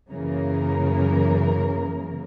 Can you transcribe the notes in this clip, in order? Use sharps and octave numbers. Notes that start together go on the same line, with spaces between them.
F#2 C#3 E3 A#3 A#4